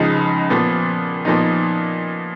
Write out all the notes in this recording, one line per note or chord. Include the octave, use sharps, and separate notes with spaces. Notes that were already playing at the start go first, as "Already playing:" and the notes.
Already playing: C#2 C#3 F3 G#3 D#4
A#2 F3 B3
A#2 F3 B3 D#4